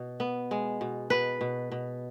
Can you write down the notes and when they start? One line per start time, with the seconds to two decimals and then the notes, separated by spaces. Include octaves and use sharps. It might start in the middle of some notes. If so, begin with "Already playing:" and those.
Already playing: B2
0.20 B3
0.51 G#3
0.81 B2
1.10 B2 B4
1.41 B2
1.72 B2